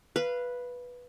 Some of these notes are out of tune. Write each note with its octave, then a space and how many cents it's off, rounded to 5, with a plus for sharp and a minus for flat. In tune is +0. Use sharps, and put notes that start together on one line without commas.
B4 -5 F5 -20